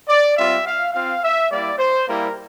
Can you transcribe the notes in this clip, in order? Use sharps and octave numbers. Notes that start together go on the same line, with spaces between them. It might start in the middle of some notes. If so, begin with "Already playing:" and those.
D5
G3 C4 F4 E5
F5
C4 F4 F5
E5
G3 A#3 E4 D5
C5
G3 A#3 E4 A#4